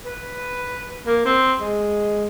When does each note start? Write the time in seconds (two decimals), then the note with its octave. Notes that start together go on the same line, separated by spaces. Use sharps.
0.06 B4
1.07 A#3
1.26 C4
1.61 G#3